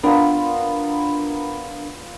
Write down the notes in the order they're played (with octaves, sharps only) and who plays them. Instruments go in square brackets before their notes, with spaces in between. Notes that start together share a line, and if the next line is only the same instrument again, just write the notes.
[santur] B3 F4 A#5 [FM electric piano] D4 A#4